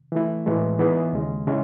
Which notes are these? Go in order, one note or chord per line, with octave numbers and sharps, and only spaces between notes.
E3 A3 E4
A2 E3 G#3
E3 B3 D#4 G#4
D#2 C#3 G#3
C#3 G#3 C#4 E4